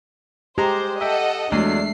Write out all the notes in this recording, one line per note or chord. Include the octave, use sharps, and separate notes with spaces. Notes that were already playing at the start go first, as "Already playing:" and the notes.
G#3 G4 C5 A#5
A4 D#5 E5 F#5 G5
E2 F#3 G#3 A3 D4 C7